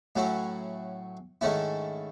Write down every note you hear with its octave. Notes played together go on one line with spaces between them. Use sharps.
A2 F#3 C#4 E4
G#2 D#3 A3 C#4 E4